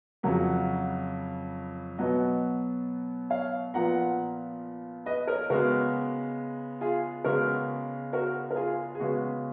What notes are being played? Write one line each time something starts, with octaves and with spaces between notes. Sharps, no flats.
F2 C#3 F#3 A#3 F#5 A#5
B2 F#3 B3 D#5 F#5
C#5 F5
A#2 F3 B3 F#5 A#5
B4 D#5
A#4 C#5
C#3 G#3 B3 F#4 A#4
F4 G#4
C#3 G#3 B3 F#4 A#4
F#4 A#4
A#4
F4 G#4
G#4
C#3 G#3 B3 F#4